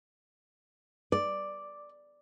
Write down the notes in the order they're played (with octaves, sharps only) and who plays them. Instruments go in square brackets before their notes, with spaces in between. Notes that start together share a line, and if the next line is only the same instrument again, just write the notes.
[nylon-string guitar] D5